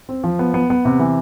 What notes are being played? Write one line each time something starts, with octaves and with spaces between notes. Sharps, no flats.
C4
F3
B3
B3
B3
C3
E3